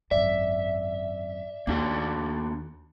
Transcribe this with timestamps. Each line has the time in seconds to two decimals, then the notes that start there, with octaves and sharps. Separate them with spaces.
0.11 G#1 F#2 D5 E5
1.67 D#2 A#3 D4 F#4